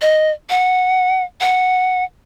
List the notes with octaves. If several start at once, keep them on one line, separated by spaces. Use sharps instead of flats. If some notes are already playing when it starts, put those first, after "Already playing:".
D#5
F#5
F#5